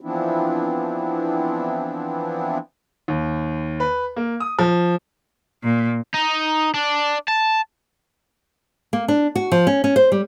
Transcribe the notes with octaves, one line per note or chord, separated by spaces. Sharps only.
E3 F3 B3 C4 D4 E4
D#2
B4
A#3
D#6
F3
A#2
D#4
D4
A5
A#3
D4
F#4
F3
C#4
C#4
C5
G3